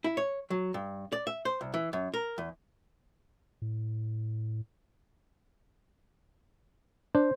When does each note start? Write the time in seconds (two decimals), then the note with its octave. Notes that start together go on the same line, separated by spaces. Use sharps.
0.04 E4
0.17 C#5
0.50 F#3
0.74 G2
1.12 D5
1.27 E5
1.45 C5
1.61 C2
1.74 E3
1.93 F#2
2.14 A#4
2.38 E2
3.62 A2
7.15 D4 C5